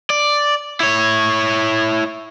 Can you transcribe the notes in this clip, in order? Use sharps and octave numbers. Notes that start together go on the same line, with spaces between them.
D5
E4 C#5